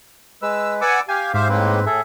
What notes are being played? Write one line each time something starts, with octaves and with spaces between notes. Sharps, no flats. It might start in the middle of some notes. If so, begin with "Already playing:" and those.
G#3 B4 E6
B4 D5 F#5 G#5 D6 E6
G4 F5 G5 G#5
G#2 G4 C5 E5 F5
A2 G#3 A#3 C4 B4
A2 G#4 A4 E5